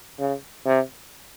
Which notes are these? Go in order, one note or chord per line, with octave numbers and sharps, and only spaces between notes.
C#3
C3